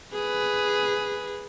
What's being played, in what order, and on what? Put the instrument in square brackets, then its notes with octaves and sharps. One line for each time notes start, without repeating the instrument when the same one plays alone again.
[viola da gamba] G#4 B4